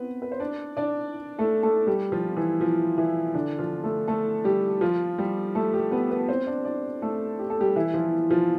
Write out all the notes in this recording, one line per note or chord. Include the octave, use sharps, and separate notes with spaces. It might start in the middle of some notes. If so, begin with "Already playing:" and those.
Already playing: B3 C4 B4
B4
C5
D4 D5
D4 D5
A3 A4
A3 A4
G3 G4
F3 F4
E3 E4
F3
E3 E4
D3 D4
F3 F4
A3 A4
A3 A4
G3 G4
F3 F4
G3 G4
A3 A4
G3 G4
B3 B4
B3 B4
C4 C5
D4 D5
D4 D5
A3 A4
G4
A4
G3 G4
E3 E4
F3 F4
F3 F4